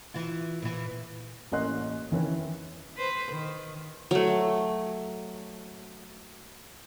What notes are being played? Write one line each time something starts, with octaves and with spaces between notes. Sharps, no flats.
E3 F4
A#2 E3
A1 A#3 C#4 D#5 C6 F#6
D#3 E3 C#4
B4 C5
D#3
F#3 A3